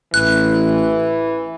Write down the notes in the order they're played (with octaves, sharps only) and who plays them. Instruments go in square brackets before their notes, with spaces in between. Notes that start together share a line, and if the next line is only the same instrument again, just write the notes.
[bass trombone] A1 [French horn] E3 [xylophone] F#6